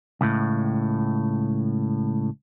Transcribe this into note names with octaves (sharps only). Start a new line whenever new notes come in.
C#2 A2